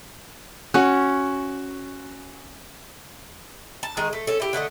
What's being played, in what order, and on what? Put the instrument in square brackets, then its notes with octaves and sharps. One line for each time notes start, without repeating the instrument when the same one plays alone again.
[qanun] C#4 [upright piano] F#4 F#6
[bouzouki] A5
D#3 G#3 G#4
A3
C#4 A4
E4 G4
D3 A3 G#4 D#5